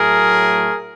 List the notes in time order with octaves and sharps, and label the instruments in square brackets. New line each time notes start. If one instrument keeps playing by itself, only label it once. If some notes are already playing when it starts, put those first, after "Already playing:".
Already playing: [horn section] A2 F#3 A3 G#4 A#4